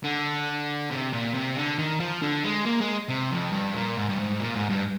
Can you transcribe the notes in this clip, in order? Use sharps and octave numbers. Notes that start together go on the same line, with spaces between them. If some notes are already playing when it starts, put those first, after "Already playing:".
D3
C3
A#2
C3
D3
D#3
F3
D3
G#3
A#3
G#3
C3
F2
G2
A#2
G#2
G2
G#2
A#2
G#2
G2